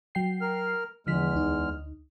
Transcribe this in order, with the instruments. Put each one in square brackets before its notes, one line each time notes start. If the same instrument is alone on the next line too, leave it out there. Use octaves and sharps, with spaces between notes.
[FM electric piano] F#3 G5 C7
[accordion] A#4 F6
[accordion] E2 G#3 F6 [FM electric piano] D3 F3 B6
[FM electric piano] D2 D#4